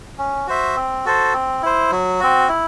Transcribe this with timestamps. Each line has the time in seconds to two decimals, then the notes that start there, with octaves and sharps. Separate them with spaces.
0.18 C#4
0.47 F#4 C5 E5
0.76 C4
1.05 F#4 A4 C5
1.33 C4
1.63 E4 C5
1.92 F#3
2.20 C4 F#4
2.48 E4